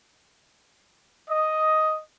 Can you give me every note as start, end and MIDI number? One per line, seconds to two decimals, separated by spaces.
1.29 2.00 75